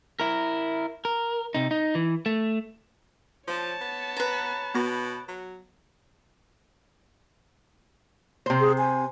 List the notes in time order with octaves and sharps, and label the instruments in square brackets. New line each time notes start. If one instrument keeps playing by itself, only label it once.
[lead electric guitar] E4 A#4
A#4
C3 D#4
D#4
E3
A3
[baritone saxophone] F3 [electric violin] C#5 A5
[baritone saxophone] B3
[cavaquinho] B4 A#5
[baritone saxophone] B2 [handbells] B3 F#4 A#6
[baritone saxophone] F#3
[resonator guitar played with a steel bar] C3 C5
[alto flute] G#4
G#5